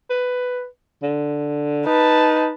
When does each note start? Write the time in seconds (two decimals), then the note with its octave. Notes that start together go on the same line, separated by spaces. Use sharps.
0.10 B4
1.03 D3
1.86 D#4 B4 A5